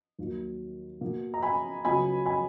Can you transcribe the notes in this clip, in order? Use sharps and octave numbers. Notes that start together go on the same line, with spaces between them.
D#2 D#3 F#3 A#3
B2 A#3
A#5
G#5 B5
C#2 C#3 F#3 B3 G#5 B5
G#5 B5